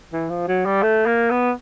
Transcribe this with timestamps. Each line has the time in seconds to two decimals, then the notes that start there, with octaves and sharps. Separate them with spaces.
0.13 E3
0.30 F3
0.48 F#3
0.66 G3
0.83 A3
1.06 A#3
1.31 B3